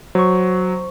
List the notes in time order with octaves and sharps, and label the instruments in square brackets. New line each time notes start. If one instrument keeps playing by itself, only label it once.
[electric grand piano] F#3 [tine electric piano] C5 C#6